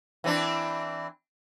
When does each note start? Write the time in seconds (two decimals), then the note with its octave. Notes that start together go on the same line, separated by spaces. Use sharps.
0.24 E3 C4 D4